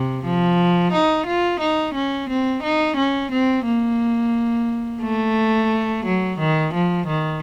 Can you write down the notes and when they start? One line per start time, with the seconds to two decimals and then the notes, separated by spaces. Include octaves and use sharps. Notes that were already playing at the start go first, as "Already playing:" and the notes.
Already playing: C3
0.24 F3
0.92 D#4
1.27 F4
1.60 D#4
1.94 C#4
2.29 C4
2.63 D#4
2.97 C#4
3.31 C4
3.65 A#3
5.02 A3
6.05 F#3
6.39 D#3
6.74 F3
7.07 D#3